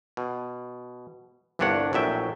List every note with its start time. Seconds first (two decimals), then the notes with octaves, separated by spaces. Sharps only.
0.17 B2
1.59 G1 C2 G2 D4 C#5 F#5
1.93 A#1 A2 F#3 E5 G5